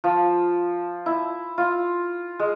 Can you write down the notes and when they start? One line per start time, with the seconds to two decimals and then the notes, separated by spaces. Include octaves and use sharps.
0.04 F3
1.06 E4
1.58 F4
2.39 G#3